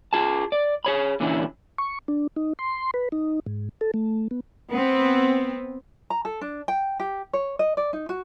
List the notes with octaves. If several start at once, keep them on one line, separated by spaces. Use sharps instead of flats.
F4 G#4 A5
D5
G#4 C#5 B5
A#2 D3 E3 C#4 E4
C#6
D4
D#4
C6
B4
D#4
G#2
A4
A3
B3
B3 C4
A#5
A4
D4
G5
G4
C#5
D#5
D5
D#4
F#4